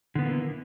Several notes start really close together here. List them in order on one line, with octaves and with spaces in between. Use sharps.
D3 B3 E3 A#3